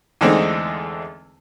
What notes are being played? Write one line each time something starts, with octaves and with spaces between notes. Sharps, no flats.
E2 D3 G#3 A3 C4 D#4